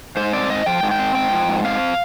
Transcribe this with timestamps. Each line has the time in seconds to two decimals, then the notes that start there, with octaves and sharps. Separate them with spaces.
0.17 G#2 C5
0.33 C4 D5
0.50 G#2 D#5
0.66 F3 G5
0.83 G#2
0.91 G5
0.99 C4
1.15 G#2 G5
1.32 F3
1.49 G#2
1.64 C4 F5